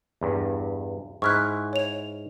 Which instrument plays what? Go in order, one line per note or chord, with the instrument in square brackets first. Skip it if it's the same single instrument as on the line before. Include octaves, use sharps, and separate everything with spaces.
[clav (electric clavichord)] E2 G2
[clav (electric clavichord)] G#2 E4 [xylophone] C#6 F6 F#6
[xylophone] C#5 F7